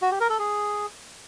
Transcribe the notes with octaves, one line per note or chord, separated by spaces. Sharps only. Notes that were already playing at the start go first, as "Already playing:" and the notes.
F#4
G4
A#4
A4
G#4